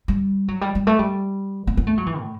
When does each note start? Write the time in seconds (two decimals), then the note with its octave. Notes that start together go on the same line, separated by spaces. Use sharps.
0.08 G3
0.48 F#3
0.61 G3
0.75 G3
0.87 A3
0.99 G3
1.67 B3
1.77 B3
1.87 A3
1.97 F#3
2.06 E3
2.20 A2